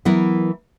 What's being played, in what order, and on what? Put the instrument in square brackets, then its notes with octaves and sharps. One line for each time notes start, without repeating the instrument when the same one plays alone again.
[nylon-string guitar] E3 B3 E4 A#4 [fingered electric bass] F#3